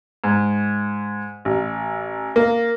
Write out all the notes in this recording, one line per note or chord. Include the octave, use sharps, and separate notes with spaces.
G#2
A1
A#3